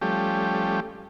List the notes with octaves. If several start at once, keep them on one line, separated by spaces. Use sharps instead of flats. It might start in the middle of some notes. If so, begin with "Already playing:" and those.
F3 G3 A3 C#4 G4